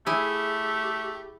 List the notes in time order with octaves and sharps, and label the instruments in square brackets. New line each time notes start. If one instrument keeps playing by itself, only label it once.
[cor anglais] A3 [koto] E4 G#4 [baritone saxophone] G4